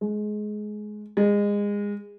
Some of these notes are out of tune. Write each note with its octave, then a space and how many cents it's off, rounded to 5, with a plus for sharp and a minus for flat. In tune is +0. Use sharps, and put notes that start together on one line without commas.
G#3 +20
G#3 -25